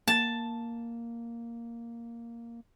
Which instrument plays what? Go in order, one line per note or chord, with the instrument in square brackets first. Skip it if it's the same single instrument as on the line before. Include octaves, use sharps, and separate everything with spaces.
[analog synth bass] A#3 [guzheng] A5